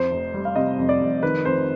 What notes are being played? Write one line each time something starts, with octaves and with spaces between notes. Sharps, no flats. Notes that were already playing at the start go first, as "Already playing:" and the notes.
Already playing: F2 C5
F1
G3
F5
C3 D#5
F2
D5
F1
D#3 B4
F2 C5